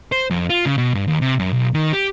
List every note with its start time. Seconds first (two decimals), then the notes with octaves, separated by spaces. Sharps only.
0.12 C5
0.30 F2
0.50 F4
0.65 C#3
0.78 B2
0.94 G2
1.08 D#2
1.21 C3
1.39 F#2
1.53 B1
1.74 D#3
1.93 G4